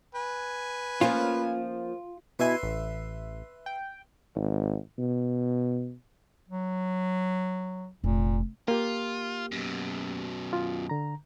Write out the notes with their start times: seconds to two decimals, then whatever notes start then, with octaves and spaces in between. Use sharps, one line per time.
0.15 B4 G#5
1.01 F3 A#3 C#4 F4
2.39 B2 E4 B4 E5 G#5 C6
2.63 A1
3.66 G5
4.35 G#1
4.98 B2
6.48 F#3
8.04 F1 A#2
8.68 A#3 F4 G4
9.52 F#2 B2
10.53 F4
10.89 D3 A#5